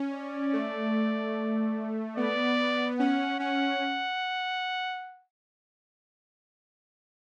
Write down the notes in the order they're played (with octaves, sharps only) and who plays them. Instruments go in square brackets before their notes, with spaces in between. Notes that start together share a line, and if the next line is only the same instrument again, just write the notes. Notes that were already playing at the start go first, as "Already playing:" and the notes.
Already playing: [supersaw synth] C#4
[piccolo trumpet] D5
[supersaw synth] A3
[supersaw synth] B3 [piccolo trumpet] D5
[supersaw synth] C#4 [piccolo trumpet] F#5
[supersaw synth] C#4 [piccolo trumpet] F#5